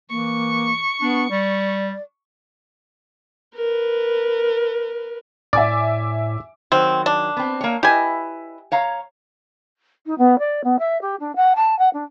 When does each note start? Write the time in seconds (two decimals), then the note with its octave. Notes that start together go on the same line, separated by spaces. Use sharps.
0.10 E3 A#3 C#6
1.01 B3 D4
1.31 G3 D5
3.55 A#4 B4
5.53 A2 D5 E5 G#5 D6
6.72 D#3 F#3 C4
7.06 D4
7.37 B3 C4
7.61 A#3 C#5
7.83 E4 G4 B4 D#5 G#5
8.72 C#5 F5 A#5
10.06 D#4
10.18 B3
10.39 D5
10.64 B3
10.79 E5
11.01 G4
11.20 D4
11.36 F#5
11.56 A5
11.79 F#5
11.93 D4